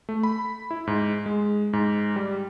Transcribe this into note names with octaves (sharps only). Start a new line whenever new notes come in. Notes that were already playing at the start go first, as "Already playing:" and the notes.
A3
B5
E4
G#2
G#3
G#2
G3